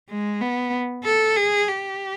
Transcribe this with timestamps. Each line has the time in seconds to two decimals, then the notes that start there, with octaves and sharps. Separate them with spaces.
0.09 G#3
0.41 B3
1.05 A4
1.36 G#4
1.69 G4